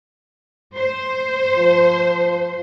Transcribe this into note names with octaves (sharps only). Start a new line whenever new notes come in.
C5
F3